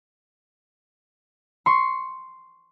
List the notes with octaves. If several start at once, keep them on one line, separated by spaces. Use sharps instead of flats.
C6 C#6